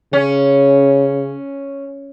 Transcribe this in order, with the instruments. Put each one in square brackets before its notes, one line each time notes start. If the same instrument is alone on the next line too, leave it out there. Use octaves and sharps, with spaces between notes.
[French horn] C#3 [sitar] C#4